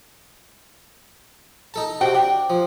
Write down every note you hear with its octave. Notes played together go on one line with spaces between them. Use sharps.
D#4 A4 A5
C3 F#4 G5
D4
F3